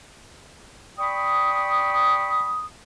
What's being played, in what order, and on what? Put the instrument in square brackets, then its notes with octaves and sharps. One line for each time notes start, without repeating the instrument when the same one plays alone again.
[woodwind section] D5 G5 B5 C#6 D#6